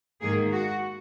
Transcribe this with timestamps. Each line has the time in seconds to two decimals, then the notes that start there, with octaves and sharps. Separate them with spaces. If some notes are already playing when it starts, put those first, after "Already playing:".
0.21 G#2 D#3 A#3 G#4
0.51 F#4